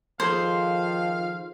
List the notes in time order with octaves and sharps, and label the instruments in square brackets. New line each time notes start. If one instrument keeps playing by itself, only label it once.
[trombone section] D#3 F3 [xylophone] G#4 A4 [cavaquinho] C5 [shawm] F5